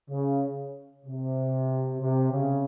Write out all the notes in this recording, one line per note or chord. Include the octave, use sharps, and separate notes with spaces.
C#3
C3
C3
C#3